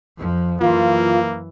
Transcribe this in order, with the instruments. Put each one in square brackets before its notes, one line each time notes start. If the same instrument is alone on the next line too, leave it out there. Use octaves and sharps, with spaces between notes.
[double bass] F2 F3
[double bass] F#2 E3 [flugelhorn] A#3 [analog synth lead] F4